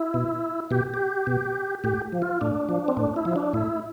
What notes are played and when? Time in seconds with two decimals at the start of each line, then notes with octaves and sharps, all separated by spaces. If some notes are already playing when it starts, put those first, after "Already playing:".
Already playing: E4
0.14 B2
0.71 B2 G4
0.94 G4
1.27 B2
1.84 A2 G4
2.12 F3
2.22 F4
2.41 A2 D4
2.69 F3
2.88 C4
2.97 A2 D4
3.16 E4
3.25 F3
3.36 D4
3.53 A2 E4